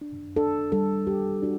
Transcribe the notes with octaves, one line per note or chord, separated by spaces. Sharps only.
D4
D4 A4
G3 A4
G4 A4
D4 F#4